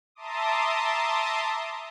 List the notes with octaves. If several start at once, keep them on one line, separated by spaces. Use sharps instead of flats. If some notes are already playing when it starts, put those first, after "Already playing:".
E5 A5 A#5 C6 D6 D#6